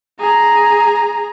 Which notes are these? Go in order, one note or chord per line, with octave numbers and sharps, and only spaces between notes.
G#4 A#5